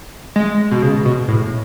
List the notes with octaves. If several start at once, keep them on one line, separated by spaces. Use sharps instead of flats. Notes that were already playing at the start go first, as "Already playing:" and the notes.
G#3
B2
C#3
B2
A2